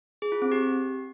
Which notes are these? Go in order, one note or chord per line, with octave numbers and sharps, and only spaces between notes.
G#4
F4
C4
G4